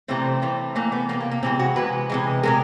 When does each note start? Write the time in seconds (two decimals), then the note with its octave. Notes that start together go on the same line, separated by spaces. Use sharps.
0.08 C3 E3 A3 C4
0.42 C3 E3 A3
0.75 C3 E3 A3 A#3
0.92 B3
1.09 C3 E3 A3 A#3
1.20 A#3
1.31 A#3
1.43 C3 E3 G#3 C4
1.59 F#4
1.76 C3 E3 G#3 B4
2.10 C3 E3 G#3
2.43 C3 E3 G#3 A#4